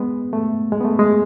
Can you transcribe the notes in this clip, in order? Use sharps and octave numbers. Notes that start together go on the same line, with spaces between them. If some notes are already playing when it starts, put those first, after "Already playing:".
Already playing: G#3 B3
A3
G#3
B3
A3
G#3